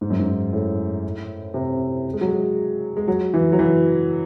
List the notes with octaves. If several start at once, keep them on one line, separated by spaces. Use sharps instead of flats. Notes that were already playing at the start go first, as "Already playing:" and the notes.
G#2
F#2
G#2
A2
C3
G#3
F#3
G#3
G#3
F#3
E3
F#3
E3